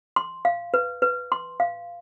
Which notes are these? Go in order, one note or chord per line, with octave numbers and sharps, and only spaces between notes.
C6
F5
B4
B4
C6
F5